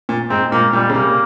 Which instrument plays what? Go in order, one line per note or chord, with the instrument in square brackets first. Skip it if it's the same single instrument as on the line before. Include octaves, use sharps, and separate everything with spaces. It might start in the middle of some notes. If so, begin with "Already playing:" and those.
[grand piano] A#2
[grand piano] G#2 [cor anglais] C4
[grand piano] A#2 [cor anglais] A#3
[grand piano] A#2 [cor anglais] G3
[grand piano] C#3
[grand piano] C3 [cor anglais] A#3